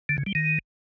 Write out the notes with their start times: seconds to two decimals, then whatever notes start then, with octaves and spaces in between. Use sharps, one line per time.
0.09 D3
0.18 C#3
0.26 G3
0.35 D#3